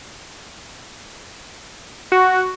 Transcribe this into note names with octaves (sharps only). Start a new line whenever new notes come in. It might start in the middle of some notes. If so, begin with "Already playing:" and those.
F#4